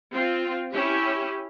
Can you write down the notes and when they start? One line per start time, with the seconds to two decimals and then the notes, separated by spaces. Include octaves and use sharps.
0.13 C4 F4
0.72 C#4 E4 G4